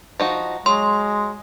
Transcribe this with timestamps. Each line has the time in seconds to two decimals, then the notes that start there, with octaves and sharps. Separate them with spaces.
0.20 F3 D#4 F#4
0.66 F#3 G#3 C6